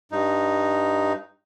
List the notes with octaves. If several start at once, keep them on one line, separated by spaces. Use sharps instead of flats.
G2 D#4